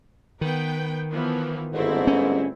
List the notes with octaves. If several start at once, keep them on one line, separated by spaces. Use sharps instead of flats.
D#3 B3 B4 G5
E3 F3 B3
G1 G#2 A3 C4 E4
C#4